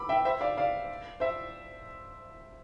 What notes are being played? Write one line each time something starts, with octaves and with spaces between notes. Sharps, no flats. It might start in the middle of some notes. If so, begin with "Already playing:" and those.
Already playing: B5 D6 E6
E5 G5
C5 E5
D5 F5
D5 F5
C5 E5